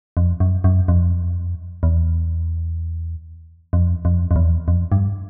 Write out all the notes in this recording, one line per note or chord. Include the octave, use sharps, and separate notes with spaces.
F2
F#2
F#2
F2
E2
F2
F2
F2
E2
F2
G2